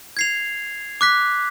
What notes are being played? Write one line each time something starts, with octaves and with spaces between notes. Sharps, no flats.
G#6 C7 F7
D6 F#6 B6